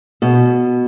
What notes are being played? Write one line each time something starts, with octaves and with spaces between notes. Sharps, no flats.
B2